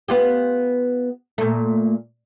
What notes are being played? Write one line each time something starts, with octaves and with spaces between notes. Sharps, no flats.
B3 F4 G4
A#2 A3